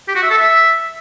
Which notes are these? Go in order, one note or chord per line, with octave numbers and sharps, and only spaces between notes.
G4
F#4
E5
A4
E5